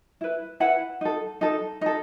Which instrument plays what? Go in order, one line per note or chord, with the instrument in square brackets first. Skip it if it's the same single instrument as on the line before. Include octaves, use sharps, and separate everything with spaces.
[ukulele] E4 B4
E4 B4 F#5
D#4 A4
D#4 A4
D#4 A4